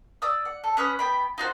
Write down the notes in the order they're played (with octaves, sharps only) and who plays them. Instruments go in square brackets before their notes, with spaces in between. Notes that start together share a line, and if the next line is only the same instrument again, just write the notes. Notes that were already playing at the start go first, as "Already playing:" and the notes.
[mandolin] D5 D#6 E6
F#5
A4
C#4 B4 D#6 F#6
B3 G5 B5
D#4 F4 F#4 C5